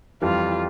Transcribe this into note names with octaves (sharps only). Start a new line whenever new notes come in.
F2 E3 G3 F4